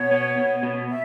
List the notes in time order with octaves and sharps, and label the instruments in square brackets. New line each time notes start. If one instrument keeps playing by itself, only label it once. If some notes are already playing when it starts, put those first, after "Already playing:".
Already playing: [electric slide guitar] B2 [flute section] C#5
[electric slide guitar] B3
B2
B2
[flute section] E5